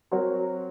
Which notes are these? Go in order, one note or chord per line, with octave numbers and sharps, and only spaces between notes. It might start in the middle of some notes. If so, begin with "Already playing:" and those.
F#3 C4 F#4 A#4 C#5